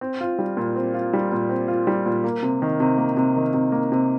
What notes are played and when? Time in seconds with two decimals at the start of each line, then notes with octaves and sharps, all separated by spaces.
0.01 C4
0.21 F4
0.39 G3
0.57 A#2
0.76 C4
0.94 F4
1.13 G3
1.32 A#2
1.49 C4
1.68 F4
1.87 G3
2.06 A#2
2.24 A#3
2.43 C3
2.62 D#3
2.80 C3
2.98 A#3
3.17 C3
3.36 D#3
3.54 C3
3.72 A#3
3.92 C3